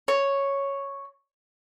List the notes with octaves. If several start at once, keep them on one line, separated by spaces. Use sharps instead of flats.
C#5